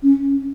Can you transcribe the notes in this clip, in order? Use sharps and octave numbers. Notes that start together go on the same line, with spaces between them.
C#4